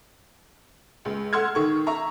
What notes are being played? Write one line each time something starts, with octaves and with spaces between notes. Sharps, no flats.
C#2 G#3
F#5 C6 E6 F6 G#6
D#3 C#6
E5 A#5 C#6